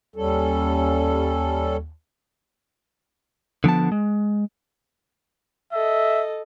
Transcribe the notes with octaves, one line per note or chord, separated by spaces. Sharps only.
D#2 G3 C#4 A4
D3 F3 B3 A5
G#3
A4 D#5 E5